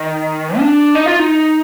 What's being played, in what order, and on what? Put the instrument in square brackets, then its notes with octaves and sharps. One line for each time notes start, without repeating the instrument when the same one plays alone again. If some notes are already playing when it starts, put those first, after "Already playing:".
Already playing: [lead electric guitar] D#3
D4
D#4
F4
D#4